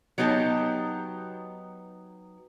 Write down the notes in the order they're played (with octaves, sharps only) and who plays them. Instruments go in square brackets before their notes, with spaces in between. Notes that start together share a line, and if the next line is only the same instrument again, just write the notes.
[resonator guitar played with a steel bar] F#3 B3 D#4 G4 A5